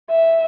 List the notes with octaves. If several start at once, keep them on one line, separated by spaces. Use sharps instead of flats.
E5